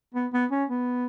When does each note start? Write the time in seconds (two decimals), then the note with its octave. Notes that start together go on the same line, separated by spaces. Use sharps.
0.14 B3
0.33 B3
0.51 C#4
0.70 B3